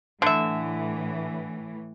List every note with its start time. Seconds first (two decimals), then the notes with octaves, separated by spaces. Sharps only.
0.22 A2 D3 E3 E5